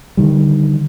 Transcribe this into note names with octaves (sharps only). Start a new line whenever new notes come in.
D3 D#3 G3